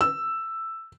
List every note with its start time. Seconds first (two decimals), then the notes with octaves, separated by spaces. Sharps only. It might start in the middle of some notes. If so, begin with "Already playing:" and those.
0.01 E6